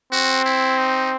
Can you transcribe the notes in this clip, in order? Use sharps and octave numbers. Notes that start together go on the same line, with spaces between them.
C4 F#4
E4
D#4